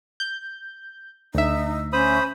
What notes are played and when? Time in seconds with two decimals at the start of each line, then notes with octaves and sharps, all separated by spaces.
0.20 G6
1.34 D2 D#4 E5
1.93 C#4 C5 B5 D#6